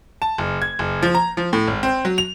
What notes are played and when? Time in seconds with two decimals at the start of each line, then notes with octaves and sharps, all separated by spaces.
0.22 A5
0.38 F#1
0.62 G#6
0.79 F#1
1.03 F3
1.15 A#5
1.37 F3
1.53 A2
1.67 G#1
1.83 C4
2.05 F#3
2.18 F7